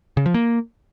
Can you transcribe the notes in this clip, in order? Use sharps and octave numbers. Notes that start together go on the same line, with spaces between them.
C#3
F3
A#3